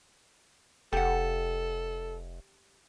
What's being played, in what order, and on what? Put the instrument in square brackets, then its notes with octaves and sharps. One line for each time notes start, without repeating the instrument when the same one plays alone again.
[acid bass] F1 [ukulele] G4 F#5 [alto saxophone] A4